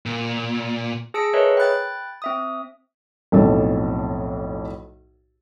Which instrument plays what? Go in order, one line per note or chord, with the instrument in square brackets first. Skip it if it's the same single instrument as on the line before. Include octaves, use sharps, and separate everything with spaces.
[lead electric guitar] A#2
[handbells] G#4 A5 E6 A#6 C#7 D7
G#4 A#4 B4 C#5 D#5 E5
G5 B5 F#6 A6
C4 E5 D#6
[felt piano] B1 F2 A2 A4